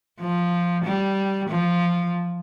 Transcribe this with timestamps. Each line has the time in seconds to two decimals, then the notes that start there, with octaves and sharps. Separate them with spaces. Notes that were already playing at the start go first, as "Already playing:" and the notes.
0.20 F3
0.84 G3
1.49 F3